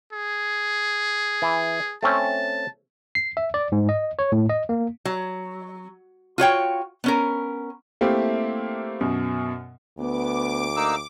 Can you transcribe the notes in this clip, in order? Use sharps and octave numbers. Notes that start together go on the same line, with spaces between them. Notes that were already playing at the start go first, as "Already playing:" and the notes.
G#4
E3
A3 C4 C#4 A5
C7
E5
D5
G#2
D#5
C#5
A2
D#5
A#3
F#3
F4 F#4 C#5 G5
B3 C#4 A#4
A3 A#3 C4 E4 G4
F#2 B2
D2 B3 D6
A#3 D#4 E6